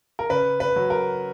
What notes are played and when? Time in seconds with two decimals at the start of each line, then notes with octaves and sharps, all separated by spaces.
0.19 A#4
0.30 C#3 B4
0.60 B4
0.76 F#3
0.90 A#4